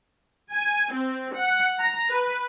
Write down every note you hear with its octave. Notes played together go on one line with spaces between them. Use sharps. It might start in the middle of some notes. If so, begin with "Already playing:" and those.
G#5
C4
F#5
A#5
B4